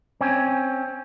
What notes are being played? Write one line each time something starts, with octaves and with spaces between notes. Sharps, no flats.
C4 C#4